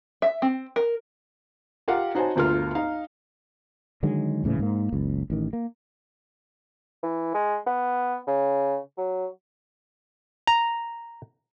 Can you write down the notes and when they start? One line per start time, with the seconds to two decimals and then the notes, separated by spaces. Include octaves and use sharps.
0.22 E5
0.42 C4
0.76 A#4
1.88 F4 G4 A#4 F5 F#5
2.15 D#4 F#4 C5 C#5 G#5 A5
2.36 G1 D2 F4 A#4 F6
2.75 D#4 F5
4.03 D3 D#3 F#3 G#3
4.44 D#1 A2 C#3 E3
4.59 G#2 A#3
4.93 F#1 C#2
5.30 A1 D#3
5.53 A#3
7.03 E3
7.34 G#3
7.67 B3
8.28 C#3
8.98 F#3
10.47 A#5